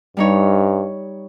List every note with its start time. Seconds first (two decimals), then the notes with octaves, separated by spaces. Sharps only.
0.17 G2 G3 D#4 C#5